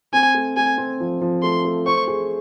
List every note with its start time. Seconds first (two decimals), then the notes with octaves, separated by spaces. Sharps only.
0.13 C4 G#5
0.34 A3
0.57 A3 G#5
0.78 C4
1.00 F3
1.21 F3
1.43 A3 C6
1.65 A3
1.86 C5 C#6
2.08 G#4